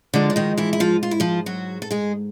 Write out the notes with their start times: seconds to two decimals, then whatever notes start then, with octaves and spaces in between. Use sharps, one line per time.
0.14 G#2 D3 F3 G#3 D4
0.30 D4
0.36 D#3 D#4
0.58 E3 E4
0.73 E4
0.80 F3 F4
1.03 F4
1.11 E4
1.20 F3 F4
1.46 F#3 F#4
1.82 A4
1.91 G#3 G#4